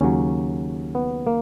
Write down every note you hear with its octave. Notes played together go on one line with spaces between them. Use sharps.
D#2 C#3 F#3 C#4
B3
A#3